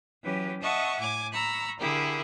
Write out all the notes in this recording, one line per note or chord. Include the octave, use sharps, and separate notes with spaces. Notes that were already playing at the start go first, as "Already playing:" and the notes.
E3 F#3 C#4 G4 B4
D#5 E5 F#5 A5 C#6 D#6
A2 G#5 D6 G#6
A#5 B5 C#6 E6 F#6
D3 E4 G4 G#4 A#4